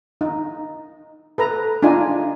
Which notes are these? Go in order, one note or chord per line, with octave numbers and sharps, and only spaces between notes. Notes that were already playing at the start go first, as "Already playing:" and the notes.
D#4
A4 B4 A#5
D4 D#4 F4 G#5